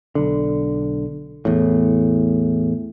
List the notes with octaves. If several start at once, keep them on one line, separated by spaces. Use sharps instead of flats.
B1 D3
E2 A2